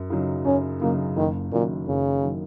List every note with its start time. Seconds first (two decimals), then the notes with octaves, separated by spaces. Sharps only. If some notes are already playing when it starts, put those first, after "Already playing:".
Already playing: F#2
0.10 C#3 F#3 D#4
0.45 F#2 C#4
0.81 C#3 F#3 A#3 D#4
1.16 F#1 D#3
1.52 F#2 A#2 D#3 F#3
1.88 F#1 C#3
2.23 D#3 F#3